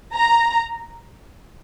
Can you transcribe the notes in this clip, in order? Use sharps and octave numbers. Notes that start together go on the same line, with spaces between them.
A#5